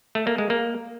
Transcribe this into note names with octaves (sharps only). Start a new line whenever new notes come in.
A3
A#3
G#3
A#3